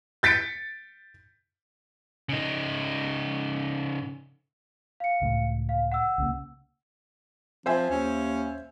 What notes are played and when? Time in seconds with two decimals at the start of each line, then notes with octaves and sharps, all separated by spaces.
0.23 G6 A6 B6 C#7 D7
2.29 C#3 D#4
5.00 F5 C#7
5.22 C#2 A2
5.69 F5
5.92 F#5 E6
6.18 C2 C#3 A#3
7.66 F3 C4 C5 E5 G#5
7.91 D#2 C#4